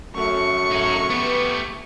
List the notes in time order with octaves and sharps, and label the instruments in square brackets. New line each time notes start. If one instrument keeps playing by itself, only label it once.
[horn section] F#2 A3 [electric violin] C#6 C#7
[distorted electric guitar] D#4 G#4
[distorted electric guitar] A3 G4 [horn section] B3